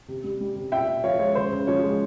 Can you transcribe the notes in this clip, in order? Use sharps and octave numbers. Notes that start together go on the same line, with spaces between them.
C3
G3
G3
C3
A#2 E5 G5
A#2
F3 C#5 F5
G#3 C#5
C#3 C5
C#3
F3 C#5
G#3